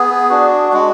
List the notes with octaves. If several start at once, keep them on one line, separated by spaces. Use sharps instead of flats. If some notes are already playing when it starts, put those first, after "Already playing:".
Already playing: B3 G#4
D4 F#4
G#3 F#4